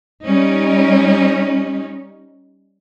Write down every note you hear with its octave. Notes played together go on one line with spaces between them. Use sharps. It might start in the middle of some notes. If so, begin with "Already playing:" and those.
G3 C#4 D#4